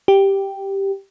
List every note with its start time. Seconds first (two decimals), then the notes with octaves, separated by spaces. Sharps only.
0.08 G4